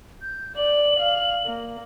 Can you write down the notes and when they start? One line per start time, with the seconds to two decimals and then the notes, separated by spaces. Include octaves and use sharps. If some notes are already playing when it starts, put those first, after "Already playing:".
0.22 G6
0.56 D5 F#7
0.99 F5
1.46 A#3